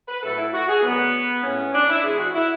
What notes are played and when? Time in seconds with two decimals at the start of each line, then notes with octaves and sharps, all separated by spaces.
0.08 B4
0.23 A2 F#3 A3 A4
0.39 E4
0.54 F#4
0.69 G#4
0.83 F#2 D3 F#3 A3 B3
1.43 A2 G#3 B3 C#4
1.73 D4
1.89 E4
2.04 G#2 E3 G#3 B3 G#4
2.19 F#4
2.34 E4